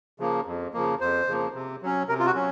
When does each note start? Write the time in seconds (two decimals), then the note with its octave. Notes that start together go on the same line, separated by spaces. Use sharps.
0.19 C#3 F3 A#3
0.46 F2
0.73 C#3 F3 A#3
1.00 F2 C5
1.28 C#3 F3 A#3
1.54 C3
1.82 F#3 C#4
2.09 C3 A#4
2.19 F4
2.26 F#4
2.35 F#3 C#4